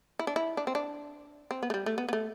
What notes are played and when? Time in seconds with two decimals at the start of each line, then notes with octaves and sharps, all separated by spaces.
0.19 E4
0.27 D4
0.36 E4
0.57 D4
0.67 C4
0.75 D4
1.51 C4
1.63 B3
1.70 A3
1.74 G3
1.86 A3
1.98 B3
2.08 B3
2.13 A3